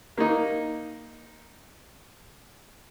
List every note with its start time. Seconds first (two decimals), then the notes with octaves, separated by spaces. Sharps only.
0.18 A#3 D#4